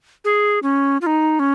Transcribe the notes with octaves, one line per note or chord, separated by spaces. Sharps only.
G#4
C#4
F4
D#4
C#4